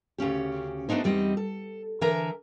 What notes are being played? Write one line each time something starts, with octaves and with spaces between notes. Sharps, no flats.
D2 C#3 C#4 G4
A3 B3 D4 D#4 C5
E2 G3 C4 D#4 D#5
A4
D3 E3 A#4 E5 G#5 A#5